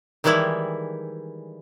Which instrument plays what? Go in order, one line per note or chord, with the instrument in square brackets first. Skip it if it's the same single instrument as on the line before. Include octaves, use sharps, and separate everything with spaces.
[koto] D#3 E3 G3 G#3 E4